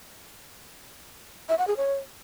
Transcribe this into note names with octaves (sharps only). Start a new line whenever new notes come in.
E5
F#5
G#4
C#5